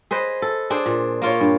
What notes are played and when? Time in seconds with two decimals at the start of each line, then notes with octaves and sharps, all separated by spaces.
0.11 G#4 B4 C5 D#5
0.42 A4
0.70 D4 G#4 C5
0.86 A#2
1.22 A#3 F4 C#5
1.40 G2